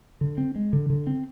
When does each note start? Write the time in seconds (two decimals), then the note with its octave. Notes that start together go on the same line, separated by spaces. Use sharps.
0.21 D3
0.38 C4
0.55 G#3
0.73 D3
0.90 D3
1.07 C4